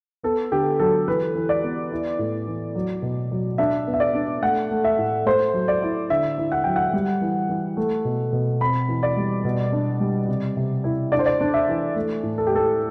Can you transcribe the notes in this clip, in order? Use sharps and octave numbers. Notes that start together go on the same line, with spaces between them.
B3 A4
D3 G4
F#3 A4
E3 B4
E3
D5
B3
E4
A2
E3
F#3
B2
F#3
D4 E5
B3
E5
D5
D4
A3 F#5
A3
E5
A2
A3 C5
F#3
D5
E4
D3 E5
E4
F#5
F#3 G5
F#5
G3
E3
E3
A3
B2
B2
C4 B5
E3
D5
G3
B2
D4
G3
C3
C3
E4
D4 D5
C5
D5
D4
E5
E3
A3
A2
A4
G4
A3 A4